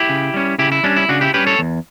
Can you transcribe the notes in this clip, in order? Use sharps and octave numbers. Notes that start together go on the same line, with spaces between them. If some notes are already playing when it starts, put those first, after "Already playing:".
Already playing: E4 G4
C#3
G3 C#4
C#3 E4 G4
E4
G3 C#4 D4
E4
C#3 D4 F#4
E4 G4
G3 C#4 G4 B4
A4 C#5
E2